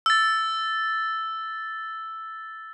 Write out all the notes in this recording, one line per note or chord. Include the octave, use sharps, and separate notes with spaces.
E6 A6